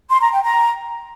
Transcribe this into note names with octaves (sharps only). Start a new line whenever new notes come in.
C6
A#5
G5
A#5